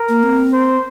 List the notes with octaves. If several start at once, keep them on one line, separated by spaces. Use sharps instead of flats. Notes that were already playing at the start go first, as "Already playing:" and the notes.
Already playing: A#4
A#3
C4
C5